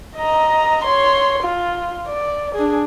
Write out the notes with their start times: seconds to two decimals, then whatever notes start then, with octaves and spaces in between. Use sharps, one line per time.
0.17 D#5 A#5
0.85 C#5 C6
1.43 F4
2.08 D5
2.55 D4 G#4